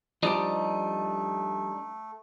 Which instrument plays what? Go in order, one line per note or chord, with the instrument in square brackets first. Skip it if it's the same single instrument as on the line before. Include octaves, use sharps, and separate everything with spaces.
[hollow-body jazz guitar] F3 G3 G4 [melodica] A3 [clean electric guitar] D4 D#4 D#5